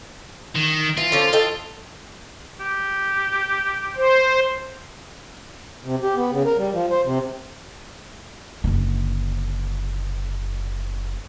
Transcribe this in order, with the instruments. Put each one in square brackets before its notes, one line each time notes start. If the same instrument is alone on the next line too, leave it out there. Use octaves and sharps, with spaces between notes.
[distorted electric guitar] D#3
[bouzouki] E3 [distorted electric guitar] F4
[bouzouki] D3 F3 C#4
A4 D#5 G5
[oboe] G4
[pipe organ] C5
[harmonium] C3
G4
B3
C#3
A#4
G3
F3
C5
C3
[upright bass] F#1 D3